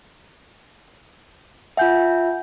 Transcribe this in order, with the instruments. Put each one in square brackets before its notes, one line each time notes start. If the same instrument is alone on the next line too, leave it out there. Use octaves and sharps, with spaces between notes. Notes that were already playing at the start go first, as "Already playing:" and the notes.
[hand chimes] F4 E5 [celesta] F#5 G#5 G6